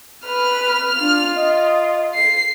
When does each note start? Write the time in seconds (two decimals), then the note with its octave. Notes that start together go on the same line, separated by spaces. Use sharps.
0.26 B4 F6
1.00 D4 F4
1.35 D#5
2.14 C7